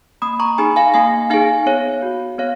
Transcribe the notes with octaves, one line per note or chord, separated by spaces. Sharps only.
A#3 B5 D#6
A#5 C#6
D#4 G#4 G#5 B5
F5 G#5
A#3 F5 G#5
D#4 G#4 F5 G#5
B3 C#5 F5
F#4
B3 C#5 F5